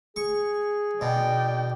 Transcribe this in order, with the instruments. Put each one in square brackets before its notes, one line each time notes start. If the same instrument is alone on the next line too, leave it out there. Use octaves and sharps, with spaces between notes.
[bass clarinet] G#4 [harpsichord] C#6
[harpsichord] B2 [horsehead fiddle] D5 G5